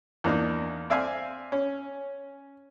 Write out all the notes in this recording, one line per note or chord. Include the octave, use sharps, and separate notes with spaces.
E2 A#3 D4 D#4
C4 D5 E5 F5 G#5
C#4